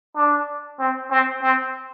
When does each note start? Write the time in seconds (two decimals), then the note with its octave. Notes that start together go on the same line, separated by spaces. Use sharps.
0.16 D4
0.80 C4
1.11 C4
1.42 C4